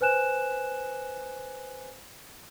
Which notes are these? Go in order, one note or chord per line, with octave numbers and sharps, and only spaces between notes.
B4 C5 G#5 F#6 E7